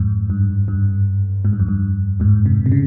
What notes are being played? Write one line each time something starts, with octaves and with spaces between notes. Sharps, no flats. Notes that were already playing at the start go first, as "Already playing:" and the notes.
Already playing: F2 G#2
G2
G2
G#2
G2
F2
G2
F2 G#2
G#2 C3
C3
C#3